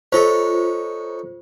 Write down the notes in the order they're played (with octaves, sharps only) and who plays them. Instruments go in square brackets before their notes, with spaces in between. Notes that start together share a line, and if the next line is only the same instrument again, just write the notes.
[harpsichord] D#4 A4 C#5 [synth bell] F4 C5